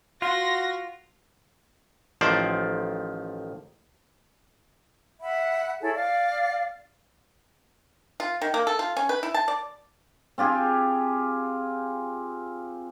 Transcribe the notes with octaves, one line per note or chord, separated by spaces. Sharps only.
F4 F#4 C6 A#6
A1 D#3 F3 C5 D5
E5 F#5 B5
E4 G#4 A4 C#5
D5 F5
F4
D#3
A#3
A4
F4
C#4
B4
E4
A5
D5
C4 F4 G4 G#4